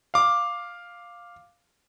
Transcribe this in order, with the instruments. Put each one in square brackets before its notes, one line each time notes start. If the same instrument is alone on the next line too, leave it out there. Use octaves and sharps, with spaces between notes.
[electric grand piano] F5 D6